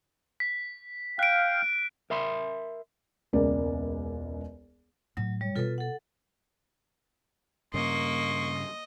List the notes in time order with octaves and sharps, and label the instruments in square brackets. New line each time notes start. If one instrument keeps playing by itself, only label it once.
[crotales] B6
[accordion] F5 G5 [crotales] F#6 D7
[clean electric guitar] A#4 E5 B5 C6
[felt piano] E1 C#2 C#3 A#3 D5
[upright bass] A2 [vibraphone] F#3
[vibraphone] G3 C#5
[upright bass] B2 B3 [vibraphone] F4 A4 B4
[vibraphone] A4 F#5
[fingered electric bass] G2 C#3 [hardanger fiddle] A#3 C#6 [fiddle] D#5 [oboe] C6